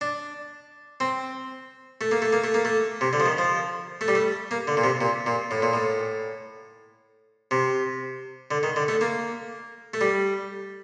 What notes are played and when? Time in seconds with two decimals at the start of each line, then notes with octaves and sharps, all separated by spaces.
0.01 D4
1.00 C4
2.01 A3
2.11 A#3
2.22 A3
2.33 A#3
2.44 A3
2.54 A#3
2.65 A3
3.01 C3
3.13 D3
3.20 F3
3.26 D#3
3.38 F3
4.01 A3
4.08 G3
4.15 A3
4.51 A#3
4.68 D3
4.77 A#2
4.84 C3
5.01 A#2
5.26 A#2
5.51 A2
5.62 A#2
5.73 A2
7.51 C3
8.51 D3
8.63 D#3
8.76 D3
8.88 A3
9.01 A#3
9.94 A3
10.01 G3